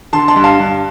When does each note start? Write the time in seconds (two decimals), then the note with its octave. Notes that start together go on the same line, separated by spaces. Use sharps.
0.13 D3 A5 C6
0.28 A5 C6
0.36 G2
0.44 F5 A5
0.59 G2